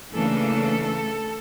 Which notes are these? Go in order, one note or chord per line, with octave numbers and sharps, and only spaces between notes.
C#3 E3 A3 A#3 D4 A4